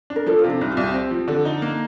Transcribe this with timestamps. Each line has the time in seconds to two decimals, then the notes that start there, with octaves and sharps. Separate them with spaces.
0.10 D4
0.16 A#4
0.26 F3 A4
0.39 F4
0.44 C3
0.50 D4
0.61 C2 D#4
0.72 F4
0.77 C2
0.83 G4
0.94 C4
1.11 F3
1.28 D3 A4
1.45 D#4
1.62 A#3